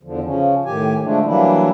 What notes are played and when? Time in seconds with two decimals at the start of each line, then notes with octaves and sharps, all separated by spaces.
0.03 E2 D3 F3
0.24 C#3 F3 C#4
0.65 A2 D#3 G4 G#5
1.03 D3 F3 G#3 A3 D4
1.25 E3 F#3 G3 A#3 D4 E4